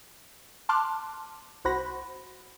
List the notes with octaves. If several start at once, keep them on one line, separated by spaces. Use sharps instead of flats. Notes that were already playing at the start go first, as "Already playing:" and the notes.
A5 C6 D6 F6 F#6
C2 F#4 C5 F#5 B5 A#6